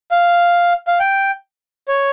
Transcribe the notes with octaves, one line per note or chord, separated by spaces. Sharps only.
F5
F5
G5
C#5